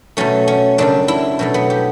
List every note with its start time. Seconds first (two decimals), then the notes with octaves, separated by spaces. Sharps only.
0.17 B2 F#3 A3 C#4
0.48 C#4
0.78 F#2 C#3 G3 D4
1.08 E4
1.39 B2 F#3 A3
1.54 B3
1.70 G4